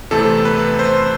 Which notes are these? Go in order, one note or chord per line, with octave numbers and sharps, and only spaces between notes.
E2 C3 E3 A3 C4 A4
B4
C5